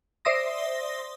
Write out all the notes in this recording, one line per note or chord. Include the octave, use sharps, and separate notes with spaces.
C5 D5 E5 C6 D#6 A#6